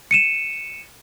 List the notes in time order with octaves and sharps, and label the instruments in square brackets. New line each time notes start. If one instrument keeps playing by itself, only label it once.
[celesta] C#7 D#7 E7